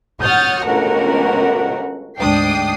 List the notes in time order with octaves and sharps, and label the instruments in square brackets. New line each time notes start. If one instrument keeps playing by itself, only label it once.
[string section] C#5 F#5 D#6 F6 G6 A6
G1 C#2 A3 F#4 A#4 F#5
D2 G#2 D4 G5 D#6 C7